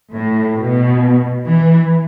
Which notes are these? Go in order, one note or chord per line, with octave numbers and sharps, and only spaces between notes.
A2
B2
E3